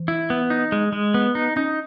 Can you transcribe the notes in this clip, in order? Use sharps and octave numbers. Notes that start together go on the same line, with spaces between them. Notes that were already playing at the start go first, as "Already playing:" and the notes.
Already playing: E3
E4
B3
D#4
G#3
G#3
B3
D#4
C#4 D#4